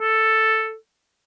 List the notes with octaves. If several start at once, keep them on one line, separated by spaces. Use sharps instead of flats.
A4